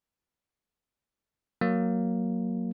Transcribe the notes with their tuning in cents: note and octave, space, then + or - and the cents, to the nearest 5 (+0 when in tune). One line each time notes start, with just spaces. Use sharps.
F#3 +0 A#3 +0